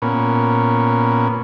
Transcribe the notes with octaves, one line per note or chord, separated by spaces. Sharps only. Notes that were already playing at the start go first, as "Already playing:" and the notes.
A#2 B3 C#4